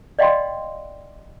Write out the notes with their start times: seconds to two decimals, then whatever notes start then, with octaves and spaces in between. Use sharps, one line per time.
0.19 D5 D#5 F5 G5 B5 C6